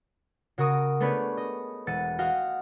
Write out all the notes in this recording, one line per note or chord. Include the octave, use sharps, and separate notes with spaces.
C#3 F#4 A#4 C#6 D#6 D7
A3 B3 D4 G#4 B4 C#5
D#5
E1 F#5 E6 A6 C#7 D#7
F#4 D#5 F5 G5